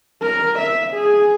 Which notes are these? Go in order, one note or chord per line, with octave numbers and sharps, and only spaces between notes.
A#4
E5
G#4